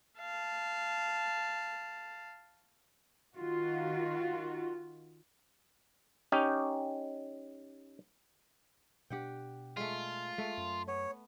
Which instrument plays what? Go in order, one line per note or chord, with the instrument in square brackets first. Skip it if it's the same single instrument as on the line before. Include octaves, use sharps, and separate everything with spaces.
[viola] F5 A5
[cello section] D#3 F4 F#4
[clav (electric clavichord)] C#4 D#4 G4
[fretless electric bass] B2 D4 [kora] G4 F#5 G5
[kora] G#3 A3 [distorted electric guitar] F4
[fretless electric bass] G#3 [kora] A3
[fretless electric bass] F#2
[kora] B3 [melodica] C#5